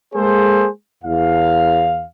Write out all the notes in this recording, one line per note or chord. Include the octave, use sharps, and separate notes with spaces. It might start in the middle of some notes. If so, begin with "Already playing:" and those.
G#3 A#3 G#4 A4 C5
E2 F5